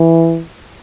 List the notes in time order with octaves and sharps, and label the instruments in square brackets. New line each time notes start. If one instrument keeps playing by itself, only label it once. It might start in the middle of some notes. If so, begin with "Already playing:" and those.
Already playing: [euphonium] E3